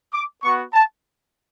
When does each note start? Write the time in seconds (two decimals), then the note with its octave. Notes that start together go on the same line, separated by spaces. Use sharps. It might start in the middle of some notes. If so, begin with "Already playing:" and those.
0.13 D6
0.43 B3 F#4 C#6
0.73 A5